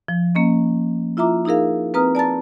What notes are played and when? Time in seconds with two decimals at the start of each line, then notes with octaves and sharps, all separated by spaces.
0.08 F3
0.35 A#3 C#4 D#5
1.17 E4 F4 E5 A#5 D6
1.45 D#4 E4 G#4 A#4 F5
1.94 C4 B4 A#5 D#6 F6
2.15 D5 A5 A#5 A6